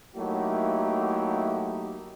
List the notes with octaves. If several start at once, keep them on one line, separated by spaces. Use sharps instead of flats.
F#3 A3 A#3 D#4 E4 G4